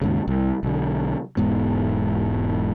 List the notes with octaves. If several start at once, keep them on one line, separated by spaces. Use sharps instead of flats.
D#2 G#2 C#3
C2
B1 D3
E1 G#2 B3